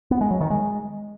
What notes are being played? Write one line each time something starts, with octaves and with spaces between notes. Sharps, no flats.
B3
G#3
F#3
D#3
G#3